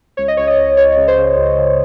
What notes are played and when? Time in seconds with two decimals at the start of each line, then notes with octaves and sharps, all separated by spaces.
0.17 C#2 C#5
0.28 D#5
0.37 C#2 C#5
0.47 D#5
0.57 C#2
0.77 C#2 C#5
0.97 C#3
1.08 C5
1.17 C#3
1.37 C#2
1.58 C#3